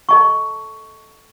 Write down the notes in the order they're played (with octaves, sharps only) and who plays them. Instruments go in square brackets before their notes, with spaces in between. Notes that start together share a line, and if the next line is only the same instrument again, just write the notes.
[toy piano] A4 D#5 A5 C#6